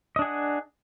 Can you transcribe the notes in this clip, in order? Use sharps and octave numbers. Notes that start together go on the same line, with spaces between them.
D4 G#4 D#5 F#5